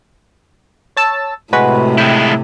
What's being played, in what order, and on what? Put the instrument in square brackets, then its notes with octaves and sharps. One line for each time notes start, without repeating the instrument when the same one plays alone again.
[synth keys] C#5 A5 E6
[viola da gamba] A2 C3 [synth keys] G#3 F#4 B4
[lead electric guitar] G#3 E4 [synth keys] G5